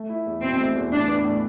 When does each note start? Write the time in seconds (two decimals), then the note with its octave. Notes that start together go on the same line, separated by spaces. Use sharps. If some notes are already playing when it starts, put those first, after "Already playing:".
Already playing: A3
0.09 E4
0.26 E2
0.42 B2 C4
0.58 A3
0.76 E2
0.92 A2 D4
1.08 B3
1.25 A2